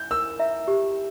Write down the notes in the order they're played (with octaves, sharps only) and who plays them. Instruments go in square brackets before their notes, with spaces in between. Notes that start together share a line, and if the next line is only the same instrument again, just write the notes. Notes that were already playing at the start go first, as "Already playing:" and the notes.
Already playing: [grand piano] G6
[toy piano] A#4 [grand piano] E6
[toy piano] E5 A#5
G4